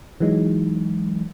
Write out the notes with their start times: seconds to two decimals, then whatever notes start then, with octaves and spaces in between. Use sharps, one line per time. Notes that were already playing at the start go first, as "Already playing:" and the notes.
0.20 E3 F#3 G#3 D#4